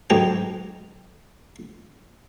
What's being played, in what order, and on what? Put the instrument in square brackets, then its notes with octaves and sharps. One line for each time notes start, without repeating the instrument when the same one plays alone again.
[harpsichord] D2 G#2 F#3 B3 G5 A#5